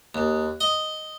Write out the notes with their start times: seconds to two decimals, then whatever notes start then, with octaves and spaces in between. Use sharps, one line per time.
0.15 D#2
0.61 D#5